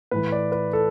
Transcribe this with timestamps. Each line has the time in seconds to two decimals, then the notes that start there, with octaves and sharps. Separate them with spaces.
0.11 A2 E3 B4
0.32 D5
0.52 B4
0.73 A4